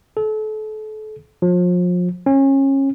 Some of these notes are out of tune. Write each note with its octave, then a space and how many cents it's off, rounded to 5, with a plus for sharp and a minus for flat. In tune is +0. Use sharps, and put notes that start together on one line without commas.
A4 -35
F3 +35
C#4 -25